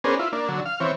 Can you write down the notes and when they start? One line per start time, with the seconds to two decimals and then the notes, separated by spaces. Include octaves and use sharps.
0.04 B3 C#4 D4 G#4 A#4 C5
0.19 E4 F4
0.33 A#3 D4
0.49 D3 F#3
0.66 F5
0.80 E3 C4 C#5